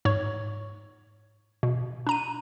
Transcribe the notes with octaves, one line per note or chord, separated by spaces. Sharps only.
G#2 C#5 C#6
B2
D4 A#5 D#7